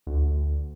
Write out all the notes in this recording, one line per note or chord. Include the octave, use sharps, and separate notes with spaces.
D2